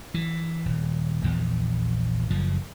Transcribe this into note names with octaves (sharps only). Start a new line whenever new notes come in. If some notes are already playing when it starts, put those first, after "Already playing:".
E3
D#1
A#1 E2
F#1 F3